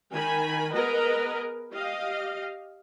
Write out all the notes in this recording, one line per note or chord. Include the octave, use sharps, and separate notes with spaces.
D#3 G#5 B5
B3 G#4 A#4 B4 D#5
G4 D#5 F5